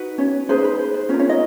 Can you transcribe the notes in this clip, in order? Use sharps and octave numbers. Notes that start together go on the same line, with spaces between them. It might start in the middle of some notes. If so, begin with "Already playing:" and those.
Already playing: D#4 F#4 B4
C#4 C#5
D#4 G#4 B4 C5
B4
C5
C5
C#4 F4 A#4 C#5
C#4 C#5
D#4 D#5